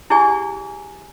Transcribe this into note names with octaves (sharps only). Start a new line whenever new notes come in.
E4 G4 G#4 D5 G#5